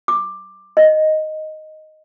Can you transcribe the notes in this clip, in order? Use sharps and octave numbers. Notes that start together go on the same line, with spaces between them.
D6
D#5